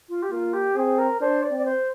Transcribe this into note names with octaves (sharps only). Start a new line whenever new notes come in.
F4
G4
A#3 F4
G4
C4 G#4
A#4
D4 C5
D5
C4
D5
C5